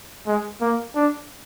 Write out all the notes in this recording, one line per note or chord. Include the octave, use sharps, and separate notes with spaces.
G#3
A#3
D4